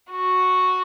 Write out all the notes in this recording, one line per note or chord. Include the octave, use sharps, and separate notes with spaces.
F#4